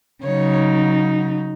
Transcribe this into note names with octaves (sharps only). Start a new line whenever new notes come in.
C#3 F#3 D#4 C#5